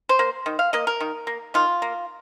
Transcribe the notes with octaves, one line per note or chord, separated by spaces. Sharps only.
C5
A#3
D#3
F5
A#3 D#5
A#4
D#3
A#3
D#3 F4
A#3